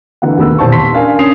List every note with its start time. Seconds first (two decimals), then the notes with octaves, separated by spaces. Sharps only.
0.22 D3 E3 A#3 F#5
0.38 D#2 A3 B3 B4 E6
0.58 D#1 E2 C5 A5 C#6
0.72 C6 B6
0.92 C#4 D4 A#4 F5 G#5
1.19 C#4 D4 D#6 C7 F7